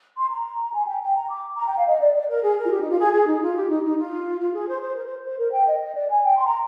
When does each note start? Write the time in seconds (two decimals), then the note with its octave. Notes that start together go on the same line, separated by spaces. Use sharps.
0.17 C6
0.31 A#5
0.74 G#5
0.87 G5
1.02 G5
1.16 A#5
1.29 D6
1.58 A#5
1.67 G5
1.77 F5
1.87 D#5
2.00 D5
2.14 D5
2.29 A#4
2.42 G#4
2.57 A#4
2.64 F4
2.71 G4
2.80 D#4
2.90 F4
2.99 G#4
3.13 G#4
3.28 D#4
3.42 F4
3.55 G4
3.69 D#4
3.84 D#4
3.98 F4
4.40 F4
4.54 G#4
4.68 C5
4.82 C5
4.96 A#4
5.06 C5
5.24 C5
5.39 A#4
5.53 G5
5.67 D#5
5.82 D#5
5.95 D5
6.10 G#5
6.24 G5
6.38 C6
6.47 A#5